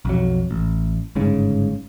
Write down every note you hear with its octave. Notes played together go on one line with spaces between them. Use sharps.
B1 F2 F#3
A1
G1 G#2 C#3